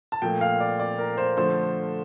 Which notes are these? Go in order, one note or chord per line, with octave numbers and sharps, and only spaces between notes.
A5
A#2 F3 A3 G5
F5
D5
D5
A#4
C5
D3 F3 A3 C5